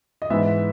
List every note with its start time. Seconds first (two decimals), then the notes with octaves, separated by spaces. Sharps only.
0.22 D#5
0.30 G#2 E3 B3 E5